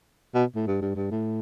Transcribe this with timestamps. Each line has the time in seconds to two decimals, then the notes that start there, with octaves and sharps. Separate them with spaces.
0.34 B2
0.56 A2
0.67 G2
0.82 G2
0.96 G2
1.11 A2